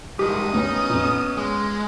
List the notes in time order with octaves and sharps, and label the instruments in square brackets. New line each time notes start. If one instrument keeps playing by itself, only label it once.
[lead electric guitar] G2 G#3 [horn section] C3 D#3 E3 [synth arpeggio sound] G4 [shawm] D#6
[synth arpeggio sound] D2 G2 [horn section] B3 C#4 [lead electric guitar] D#4
[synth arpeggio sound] F2 A#2
[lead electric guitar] G#3